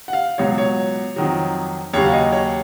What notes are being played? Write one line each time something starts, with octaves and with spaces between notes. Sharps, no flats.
F#5
F5
C#2 B2 F#3 C#5
C#5
F2 D#3 F#3
D#2 C#3 F#3 C#5
F5
D#5
C#5